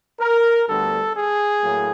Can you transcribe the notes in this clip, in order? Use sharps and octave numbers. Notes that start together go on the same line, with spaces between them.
A#4
D2 D3 G3 B3 A4
G#4
A2 F#3 A#3